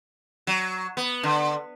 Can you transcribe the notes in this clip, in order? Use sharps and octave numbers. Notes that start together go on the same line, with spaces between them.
F#3
B3
D3